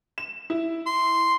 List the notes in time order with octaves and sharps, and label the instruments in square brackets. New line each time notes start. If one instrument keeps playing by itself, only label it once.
[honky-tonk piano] E7
E4
[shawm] C6